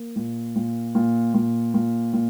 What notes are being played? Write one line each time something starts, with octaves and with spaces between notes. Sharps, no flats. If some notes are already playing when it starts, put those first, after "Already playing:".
Already playing: A#3
A#2
A#2
A#2
A#2
A#2
A#2